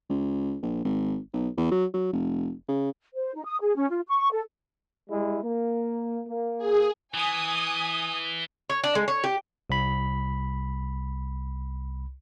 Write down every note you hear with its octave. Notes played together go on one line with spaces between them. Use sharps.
C#2
A#1
G#1
B1
E2
F#3
F#3
F1
C#3
C5
D#4
D#6
G#4
C#4
F4
C#6
A4
G3 G#3 E4
A#3
A#3
G#4
E3 G#5 D#6
C#5
D4
G#3
C#5
G4
C2 B5